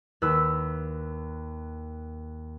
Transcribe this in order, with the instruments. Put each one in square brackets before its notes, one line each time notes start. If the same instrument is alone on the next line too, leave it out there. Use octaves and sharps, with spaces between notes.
[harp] D#2 B4 E6